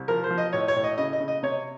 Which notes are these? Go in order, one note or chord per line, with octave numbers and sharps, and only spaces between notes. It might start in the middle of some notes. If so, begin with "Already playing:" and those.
Already playing: C2
F3 A#4
C5
F3
D#5
A2 C#5
C#5
A2
D#5
C#3 D#5
D#5
C#3
D#5
C3 C#5